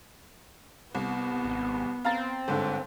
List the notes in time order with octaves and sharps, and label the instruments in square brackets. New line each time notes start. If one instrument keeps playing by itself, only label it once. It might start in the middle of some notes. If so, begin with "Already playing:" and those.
[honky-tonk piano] C2 [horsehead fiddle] B3
[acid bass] G#1
[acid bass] C4 [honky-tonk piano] F5 A#5 A6
[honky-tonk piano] G1 G#2 D3